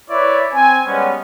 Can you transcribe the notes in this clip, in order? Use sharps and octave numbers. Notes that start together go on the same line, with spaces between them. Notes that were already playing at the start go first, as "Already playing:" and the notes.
E4 B4 C#5 D5
C4 G#5
G3 G#3 B3 C#4